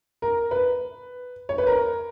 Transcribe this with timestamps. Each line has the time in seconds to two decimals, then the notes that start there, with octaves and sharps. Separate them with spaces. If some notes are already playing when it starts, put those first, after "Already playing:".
0.22 A#4
0.51 B4
1.49 C#5
1.58 B4
1.67 A#4